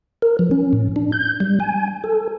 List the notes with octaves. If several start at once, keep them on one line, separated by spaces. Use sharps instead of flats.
A#4
F3
C#4
A2
D4
G6
G3
G#5
A4